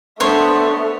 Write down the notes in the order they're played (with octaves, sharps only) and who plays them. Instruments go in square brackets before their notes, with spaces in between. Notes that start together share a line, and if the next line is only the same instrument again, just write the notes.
[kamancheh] A3 [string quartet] B3 D4 [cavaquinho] C5 C#5